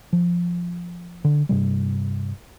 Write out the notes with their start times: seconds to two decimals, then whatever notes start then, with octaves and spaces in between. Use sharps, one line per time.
0.13 F3
1.24 D3
1.49 G2 C3 G3